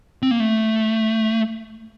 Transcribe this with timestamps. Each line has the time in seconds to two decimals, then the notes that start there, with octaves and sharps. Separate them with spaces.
0.23 C4
0.31 A#3
0.40 A3